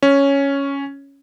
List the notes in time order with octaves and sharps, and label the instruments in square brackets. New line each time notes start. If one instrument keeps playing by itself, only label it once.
[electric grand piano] C#4